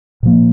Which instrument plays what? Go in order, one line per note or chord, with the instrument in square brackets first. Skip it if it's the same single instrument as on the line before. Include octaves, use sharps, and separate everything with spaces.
[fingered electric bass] A#2 F3 A#3